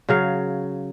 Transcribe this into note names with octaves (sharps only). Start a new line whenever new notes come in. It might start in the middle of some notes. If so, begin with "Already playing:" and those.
C#3 F#3 F5